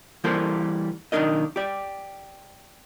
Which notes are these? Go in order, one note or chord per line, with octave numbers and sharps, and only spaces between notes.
E3 G3 A#3 A4 A#4 C5
B1 D#3 F#3 D4 A#4 D#5
G4 D5